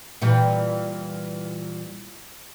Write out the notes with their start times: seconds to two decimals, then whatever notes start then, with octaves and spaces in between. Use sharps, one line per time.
0.21 A#2 E3 G3